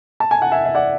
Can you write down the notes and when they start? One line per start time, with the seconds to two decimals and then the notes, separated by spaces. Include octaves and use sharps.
0.20 A5
0.31 G#5
0.42 F#5
0.52 E5 G#5
0.65 E5
0.75 D5 F#5